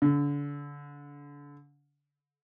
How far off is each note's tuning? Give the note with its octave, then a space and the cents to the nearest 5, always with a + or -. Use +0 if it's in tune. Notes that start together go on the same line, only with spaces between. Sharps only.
D3 -30